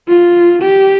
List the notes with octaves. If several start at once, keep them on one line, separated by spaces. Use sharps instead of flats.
F4
G4